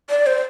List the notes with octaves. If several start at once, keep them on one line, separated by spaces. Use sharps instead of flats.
D5
C5